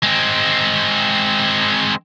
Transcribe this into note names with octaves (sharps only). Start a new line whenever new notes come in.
G#3 C4